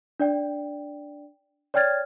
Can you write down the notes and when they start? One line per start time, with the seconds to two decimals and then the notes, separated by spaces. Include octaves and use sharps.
0.20 D4 D5 G5
1.74 C#5 D5 G5 F6 G#6 A6